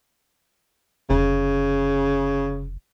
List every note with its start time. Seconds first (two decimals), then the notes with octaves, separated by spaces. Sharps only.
1.10 F1 C#3